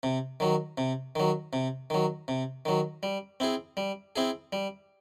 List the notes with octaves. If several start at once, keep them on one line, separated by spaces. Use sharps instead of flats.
C3
D#3 F#3
C3
D#3 F#3
C3
D#3 F#3
C3
D#3 F#3
G3
C4 E4 G#4
G3
C4 E4 G#4
G3